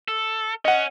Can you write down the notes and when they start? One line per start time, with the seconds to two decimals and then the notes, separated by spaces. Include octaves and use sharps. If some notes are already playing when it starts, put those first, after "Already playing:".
0.08 A4
0.65 C#4 D#5 F#5